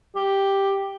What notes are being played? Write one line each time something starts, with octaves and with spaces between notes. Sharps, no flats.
G4